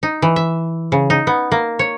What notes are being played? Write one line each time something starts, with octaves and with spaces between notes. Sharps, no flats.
D#4
E3
E5
C#3
D#4
B3
A#3
C#5